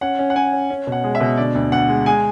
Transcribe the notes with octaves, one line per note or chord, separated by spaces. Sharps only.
C#4 F#5
C#4
F#5
C#4 G#5
C#4
C#4
B2
F#5
G#3
E5
B2
D3 D5
D2
D2 F#5
G#3
G#3 G#5